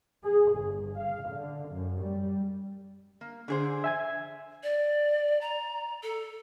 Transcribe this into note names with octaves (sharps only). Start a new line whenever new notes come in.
G#4
G1
F5
D3
F#2
G3
A#3
D3 G#4 C5
E5 G#5 G#6
D5
A#5
A4